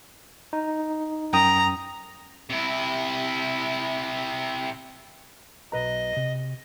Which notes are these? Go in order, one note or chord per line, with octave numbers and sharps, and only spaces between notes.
D#4
F#2 G5 A#5 D#6
C3 E4
B1 B4 D#5 A#5
C3